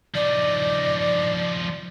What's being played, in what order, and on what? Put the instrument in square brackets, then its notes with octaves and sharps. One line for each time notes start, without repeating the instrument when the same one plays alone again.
[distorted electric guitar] F3 D#4 [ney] D5